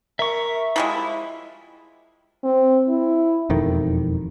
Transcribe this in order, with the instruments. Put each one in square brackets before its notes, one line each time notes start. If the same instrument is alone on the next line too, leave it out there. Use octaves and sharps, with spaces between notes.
[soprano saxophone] A#4 [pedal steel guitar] E5 C#6
[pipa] F3 G3 G#3 [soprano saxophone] E4
[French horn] C4
E4
[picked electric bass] E1 F2 D#3